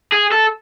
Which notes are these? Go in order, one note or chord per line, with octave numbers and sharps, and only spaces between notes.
G#4
A4